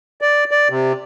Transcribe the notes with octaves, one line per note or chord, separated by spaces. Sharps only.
D5
D5
C3